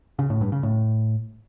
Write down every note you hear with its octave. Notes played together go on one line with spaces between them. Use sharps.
C#3
A2
G2
C#3
A2